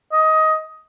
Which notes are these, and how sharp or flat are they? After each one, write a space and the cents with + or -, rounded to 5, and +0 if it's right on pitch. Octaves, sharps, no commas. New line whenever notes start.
D#5 +15